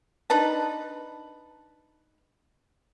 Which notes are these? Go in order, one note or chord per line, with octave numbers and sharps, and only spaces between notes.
D4 D#4 B4 A5